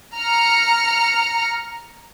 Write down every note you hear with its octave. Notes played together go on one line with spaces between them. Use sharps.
A#5 F6 C#7